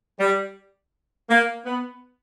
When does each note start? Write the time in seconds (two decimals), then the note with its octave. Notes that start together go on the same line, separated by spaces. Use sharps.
0.19 G3
1.30 A#3
1.65 B3